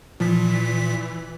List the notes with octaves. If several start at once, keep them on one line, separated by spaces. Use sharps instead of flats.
A#2 E3 F3 B6